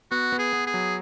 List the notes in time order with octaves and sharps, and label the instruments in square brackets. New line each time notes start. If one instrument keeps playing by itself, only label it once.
[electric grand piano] B3 [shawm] F#4
[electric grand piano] B3
[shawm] G#4
[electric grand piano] B3
[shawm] G#4
[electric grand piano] F#3